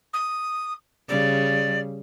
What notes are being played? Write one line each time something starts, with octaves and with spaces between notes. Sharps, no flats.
D#6
C#3 G3 D5